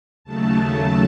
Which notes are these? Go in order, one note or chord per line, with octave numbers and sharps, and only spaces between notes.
D#2 C#3 F#3 A3 A5